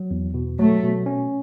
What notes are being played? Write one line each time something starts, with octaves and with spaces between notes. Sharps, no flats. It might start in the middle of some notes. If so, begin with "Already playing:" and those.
Already playing: F#3
E2
B2
F#3 A3
B2
C#4